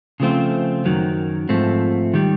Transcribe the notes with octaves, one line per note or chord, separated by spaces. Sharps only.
C#3 F3 A3 C4 F4
F#2 D#3 F#3
G#2 F3 A3 C4
D#3 G3